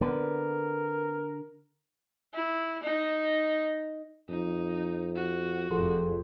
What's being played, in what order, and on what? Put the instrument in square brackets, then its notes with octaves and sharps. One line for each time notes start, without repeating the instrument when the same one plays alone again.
[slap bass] D3 [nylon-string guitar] B3 C4 B4 [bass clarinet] A#4
[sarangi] E4
D#4
[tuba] F2 [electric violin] D#4
[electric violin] F#4
[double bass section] F1 F2 [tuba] F3 [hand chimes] G#4 A4 C6